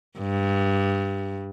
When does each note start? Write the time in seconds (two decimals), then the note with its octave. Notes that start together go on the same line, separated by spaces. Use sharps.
0.19 G2